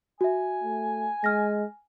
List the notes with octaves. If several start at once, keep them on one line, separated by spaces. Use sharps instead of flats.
F#4 E5 G#5
A3
G#3 F6 A#6